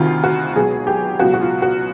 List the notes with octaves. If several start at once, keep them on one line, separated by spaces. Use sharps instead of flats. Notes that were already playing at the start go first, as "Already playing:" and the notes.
Already playing: D2 C3 D#3 F4
F#4
B1 B2 G#3 G#4
G4
C#2 B2 F#3 F#4
F#4
F4
F#4